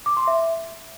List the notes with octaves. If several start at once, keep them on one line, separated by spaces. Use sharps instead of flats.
D6
C6
E5